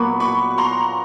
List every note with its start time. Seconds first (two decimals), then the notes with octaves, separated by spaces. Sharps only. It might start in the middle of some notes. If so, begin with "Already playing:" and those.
Already playing: A#2 F#3 B3 B5 C#6 D6
0.20 B5 C#6
0.51 C#6
0.58 A#5 C6